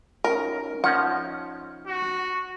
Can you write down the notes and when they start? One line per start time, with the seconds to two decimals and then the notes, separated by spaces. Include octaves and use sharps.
0.24 C#4 D#4 A#4
0.84 F3 C#4 D#4 F#5
1.87 F#4